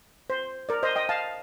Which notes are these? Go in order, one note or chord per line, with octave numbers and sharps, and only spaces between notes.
C5
A#4 D5
C5 D#5
D#5 G5
F5 A5